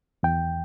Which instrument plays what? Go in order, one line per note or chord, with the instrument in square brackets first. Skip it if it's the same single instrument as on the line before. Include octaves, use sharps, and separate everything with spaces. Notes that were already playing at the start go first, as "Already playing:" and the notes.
[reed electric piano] E2 G5